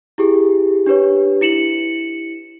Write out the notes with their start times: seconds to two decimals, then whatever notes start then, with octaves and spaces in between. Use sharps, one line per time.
0.18 E4 G4 G#4
0.86 D4 G4 B4 C#5
1.41 E4 C#7 E7 F#7